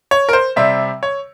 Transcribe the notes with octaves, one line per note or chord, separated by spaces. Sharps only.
C#5
A#4
C5
C3 G3 C4 E5
C#5